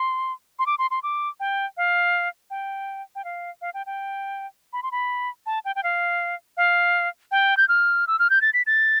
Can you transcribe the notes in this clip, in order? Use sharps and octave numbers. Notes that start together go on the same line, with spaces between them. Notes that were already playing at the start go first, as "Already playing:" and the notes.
Already playing: C6
C6
D6
C6
C6
D6
G5
F5
G5
G5
F5
F5
G5
G5
B5
C6
B5
A5
G5
G5
F5
F5
G5
G6
F6
E6
F6
G6
A6
B6
A6